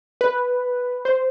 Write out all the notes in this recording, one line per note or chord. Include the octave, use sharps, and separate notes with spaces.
B4
C5